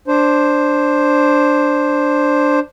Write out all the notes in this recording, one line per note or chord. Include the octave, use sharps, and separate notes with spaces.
D4 C5